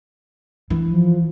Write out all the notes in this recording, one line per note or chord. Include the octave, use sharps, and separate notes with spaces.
E3
F3